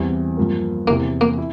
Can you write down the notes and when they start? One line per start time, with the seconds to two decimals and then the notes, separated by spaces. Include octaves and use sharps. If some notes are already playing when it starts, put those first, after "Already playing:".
Already playing: E2 E3 G3 C4
0.37 G2 F3 A#3
0.88 E2 C3 E3 A#3
1.21 A#3
1.38 E4